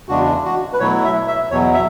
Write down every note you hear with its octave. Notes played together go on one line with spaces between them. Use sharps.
E2 C#3 G#3 D4 F#4
F#4
B4
B2 F#3 A3 E4 C#5
E5
E5
E2 B2 F#3 C#5
E5